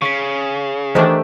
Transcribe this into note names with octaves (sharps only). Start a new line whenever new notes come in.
C#3 C#6 B6
D#3 E3 A3 D4 G4 C5 E5